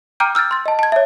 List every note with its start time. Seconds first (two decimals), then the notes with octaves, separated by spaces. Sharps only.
0.20 G5 A#5 D6 F6 G6 D7
0.35 E6 F6 G6 A6
0.51 C6 A6
0.66 D#5 A5
0.79 A5 G#6
0.92 C#5 E5